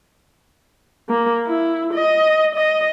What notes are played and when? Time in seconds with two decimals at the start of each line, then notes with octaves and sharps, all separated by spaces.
1.09 A#3
1.46 E4
1.94 D#5
2.55 D#5